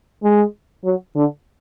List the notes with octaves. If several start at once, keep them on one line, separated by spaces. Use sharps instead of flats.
G#3
F#3
D3